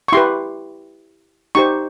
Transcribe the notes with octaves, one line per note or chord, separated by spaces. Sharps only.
C#6
E4 G4 B4 C6
D#4 G4 C5 C#6